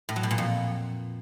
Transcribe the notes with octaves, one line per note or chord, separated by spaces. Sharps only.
A2
F#3
B2
A#2
F2